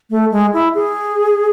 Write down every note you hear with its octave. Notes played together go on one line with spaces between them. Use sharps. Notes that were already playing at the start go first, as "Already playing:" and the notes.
A3
G#3
E4
G#4